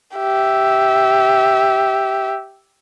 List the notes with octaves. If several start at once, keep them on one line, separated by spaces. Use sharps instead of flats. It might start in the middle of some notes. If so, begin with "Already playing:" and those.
G4 E5